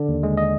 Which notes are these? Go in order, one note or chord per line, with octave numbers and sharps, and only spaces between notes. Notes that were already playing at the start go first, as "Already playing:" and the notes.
Already playing: D3 D5
D#2
G#3
D#5